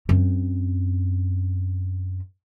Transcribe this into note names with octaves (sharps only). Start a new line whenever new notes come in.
F#2 C4